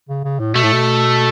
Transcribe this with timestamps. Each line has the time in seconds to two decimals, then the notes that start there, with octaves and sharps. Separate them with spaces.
0.09 C#3
0.24 C#3
0.40 A2
0.54 B2 A3
0.64 A2
0.73 B2